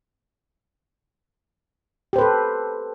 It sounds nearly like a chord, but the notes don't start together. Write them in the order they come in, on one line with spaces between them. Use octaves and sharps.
G4 C5 B4 A4